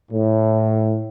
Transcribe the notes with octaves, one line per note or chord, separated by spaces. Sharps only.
A2